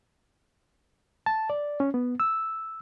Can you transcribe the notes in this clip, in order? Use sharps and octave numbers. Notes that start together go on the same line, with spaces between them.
A5
D5
C#4
B3
E6